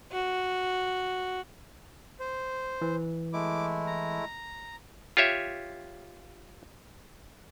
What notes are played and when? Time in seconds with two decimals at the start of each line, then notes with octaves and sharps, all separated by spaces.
0.12 F#4
2.20 C5
2.82 E3
3.33 G#3 A3 E4 D6
3.87 A#5
5.17 F4 G4 C#5 E5